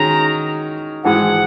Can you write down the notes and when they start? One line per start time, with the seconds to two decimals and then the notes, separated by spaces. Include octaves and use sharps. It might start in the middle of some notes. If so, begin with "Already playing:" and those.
Already playing: D#3 G#3 C#4 F#4 A#5
1.04 G#1 G#2 E3 G#3 F#5